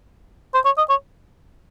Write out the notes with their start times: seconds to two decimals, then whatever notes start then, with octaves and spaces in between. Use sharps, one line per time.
0.54 C5
0.65 C#5
0.78 D#5
0.90 C#5